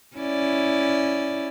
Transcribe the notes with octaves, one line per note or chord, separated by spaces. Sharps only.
C#4 E4 D5